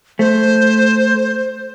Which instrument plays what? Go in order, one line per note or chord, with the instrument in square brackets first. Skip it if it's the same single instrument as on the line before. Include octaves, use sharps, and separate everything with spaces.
[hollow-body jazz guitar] A3 [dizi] C5